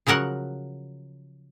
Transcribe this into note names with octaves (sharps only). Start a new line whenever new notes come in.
C#3 F3 F#3 A#4 F#5